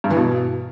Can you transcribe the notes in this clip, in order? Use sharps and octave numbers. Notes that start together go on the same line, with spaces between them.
G2
E3
B2